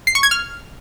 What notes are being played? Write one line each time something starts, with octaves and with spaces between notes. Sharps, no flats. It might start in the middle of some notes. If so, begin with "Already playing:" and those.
C7
C#6
G#6
F6